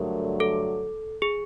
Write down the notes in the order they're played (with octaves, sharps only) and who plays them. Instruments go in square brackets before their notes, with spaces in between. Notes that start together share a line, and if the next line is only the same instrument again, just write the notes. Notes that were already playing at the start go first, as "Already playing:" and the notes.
Already playing: [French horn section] G2 D3 F#3 A3 [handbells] A#4
[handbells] A4
G#4